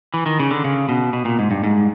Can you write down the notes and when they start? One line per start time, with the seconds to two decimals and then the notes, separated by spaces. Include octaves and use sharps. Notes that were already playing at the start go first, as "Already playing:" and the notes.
0.14 E3
0.26 D#3
0.39 C#3
0.51 D3
0.64 C#3
0.89 B2
1.13 B2
1.25 A#2
1.39 G#2
1.51 G2
1.64 G#2